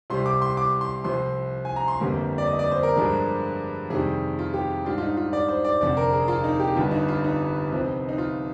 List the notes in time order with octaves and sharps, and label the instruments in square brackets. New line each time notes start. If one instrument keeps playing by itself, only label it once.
[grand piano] C2 C3 G3 C6
D6
C6
D6
C6
C2 C3 F3 C6
G#5
A#5
C6
G1 F2 D3 G3 A#3
D5
D#5
D5
C5
A#4
G2 F3 G#3 D4
F2 C3 D#3 G3 G#4
F4
G4
G#2 G3 D4 F4
F4
D#4
F4
D5
C5
D5
F1 F2 D3 D5
A#4
G#4
F4
D#4
G4
G1 G2 D3 F4
D#4
F4
D#4
C2 C3 F3
D#4
F4